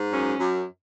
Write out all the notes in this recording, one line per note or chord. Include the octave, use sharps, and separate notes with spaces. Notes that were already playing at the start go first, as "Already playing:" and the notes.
Already playing: G#2
F#2 C#4
F#2